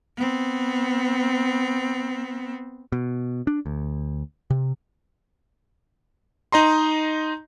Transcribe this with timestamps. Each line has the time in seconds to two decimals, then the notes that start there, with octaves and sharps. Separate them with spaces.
0.17 B3 C4
2.92 B2
3.47 D4
3.66 D2
4.50 C3
6.52 D#4 D#5 A#5 C6